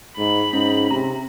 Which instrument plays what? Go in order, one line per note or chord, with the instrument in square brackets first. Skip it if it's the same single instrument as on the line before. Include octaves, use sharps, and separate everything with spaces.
[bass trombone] G#2 [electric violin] B5
[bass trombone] G#2 [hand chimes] C#4
[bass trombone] C3 [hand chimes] A#5